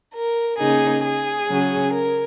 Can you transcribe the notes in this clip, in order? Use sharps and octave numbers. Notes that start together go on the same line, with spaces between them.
A#4
C#3 A#3 D#4 G#4
G#4
C#3 F#3 C#4
A#4